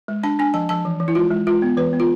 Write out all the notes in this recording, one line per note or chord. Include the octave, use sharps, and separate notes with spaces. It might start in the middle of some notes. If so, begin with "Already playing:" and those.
G#3
D4 A5
D4 G#5
F3 A5
F3 A5
E3
E3
E4
G#3 F4
G#3
G#3 F4
B3
E3 B4
B3
F4